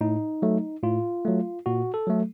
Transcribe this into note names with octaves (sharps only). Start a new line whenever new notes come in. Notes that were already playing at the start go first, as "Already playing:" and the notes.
A2 D#4
F#3 A3
A2 F4
F#3 A3
A#2 F#4
A4
F#3 A3